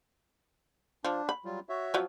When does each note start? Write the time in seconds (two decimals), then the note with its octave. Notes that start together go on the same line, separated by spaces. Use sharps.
1.05 F3 D4
1.29 B5
1.45 F#3 G3 F4
1.69 F#4 C#5 E5
1.94 F3 F#3